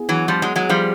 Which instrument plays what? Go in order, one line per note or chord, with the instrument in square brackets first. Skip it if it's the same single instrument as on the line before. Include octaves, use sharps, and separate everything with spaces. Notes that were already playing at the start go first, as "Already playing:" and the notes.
Already playing: [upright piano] B3 E4 G#4
[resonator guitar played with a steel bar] E3 F#3
F3 G3
F#3 G#3
F#3 G#3
F3 G3